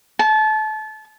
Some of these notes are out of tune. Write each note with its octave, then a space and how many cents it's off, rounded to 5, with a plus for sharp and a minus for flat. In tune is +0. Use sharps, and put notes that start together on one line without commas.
A5 -30